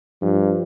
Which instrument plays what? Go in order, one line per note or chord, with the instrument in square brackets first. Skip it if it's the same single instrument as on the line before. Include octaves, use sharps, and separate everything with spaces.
[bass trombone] G2 [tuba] F3